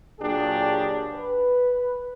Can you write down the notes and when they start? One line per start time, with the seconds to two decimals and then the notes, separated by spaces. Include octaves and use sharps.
0.20 A#2 F#3 D4 G4 G#4
1.14 B4